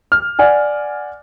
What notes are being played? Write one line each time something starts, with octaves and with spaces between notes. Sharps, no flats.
F6
D5 F#5 G#5